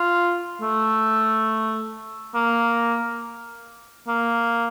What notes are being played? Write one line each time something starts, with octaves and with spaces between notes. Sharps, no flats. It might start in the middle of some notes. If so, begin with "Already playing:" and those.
Already playing: F4
A3
A#3
A#3